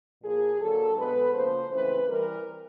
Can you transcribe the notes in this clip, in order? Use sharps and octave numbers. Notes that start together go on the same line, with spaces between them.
A#2 F3 A#3 G#4
D3 F#3 A#3 A4
B2 G#3 B3 B4
C#3 F3 A#3 C5
C#3 E3 A3 C4 B4
E3 G3 C4 A#4